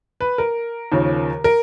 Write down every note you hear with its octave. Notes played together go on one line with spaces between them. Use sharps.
B4
A#4
D#2 C#3 F3
A#4